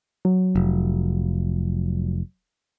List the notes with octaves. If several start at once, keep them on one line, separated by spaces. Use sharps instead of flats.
F#3
F1